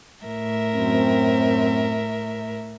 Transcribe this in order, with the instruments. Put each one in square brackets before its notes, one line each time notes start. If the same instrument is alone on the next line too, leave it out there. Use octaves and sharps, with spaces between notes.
[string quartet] A2 A#4 E5
[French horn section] F#2 C4